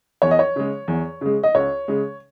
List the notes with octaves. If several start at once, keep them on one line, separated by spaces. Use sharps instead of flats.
E2 C#5
D#5
C#5
C#3 G#3
E2
C#3 G#3
D#5
C#2 C#5
C#3 G#3